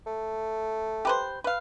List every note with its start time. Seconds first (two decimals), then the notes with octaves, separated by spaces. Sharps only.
0.06 A3
1.05 G4 B4 C5
1.44 B4 F5